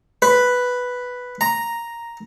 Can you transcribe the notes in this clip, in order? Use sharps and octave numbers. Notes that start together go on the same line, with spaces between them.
B4
A#5